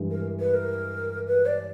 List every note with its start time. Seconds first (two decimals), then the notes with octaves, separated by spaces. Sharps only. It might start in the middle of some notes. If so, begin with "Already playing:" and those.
Already playing: G2 E3 G#3
0.11 A#4
0.40 B4
0.54 A#4
1.27 B4
1.46 D5